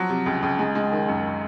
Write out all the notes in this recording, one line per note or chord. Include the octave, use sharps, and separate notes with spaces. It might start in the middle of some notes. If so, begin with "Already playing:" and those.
Already playing: F3 F#3
C3
C#2
C#2
G#3
G#3
D#3
F#2